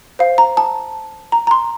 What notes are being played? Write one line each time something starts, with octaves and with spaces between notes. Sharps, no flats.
C5 F5
A#5
A5
A#5
A#5
C6